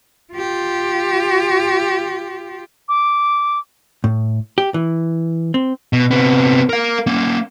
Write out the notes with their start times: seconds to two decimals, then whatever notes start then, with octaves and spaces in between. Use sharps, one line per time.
0.33 F4 G4
2.89 D6
4.04 A2
4.58 G4
4.74 E3
5.54 C4
5.93 B2
6.11 C3 B3
6.69 A#4 F5
7.07 A#3 C#4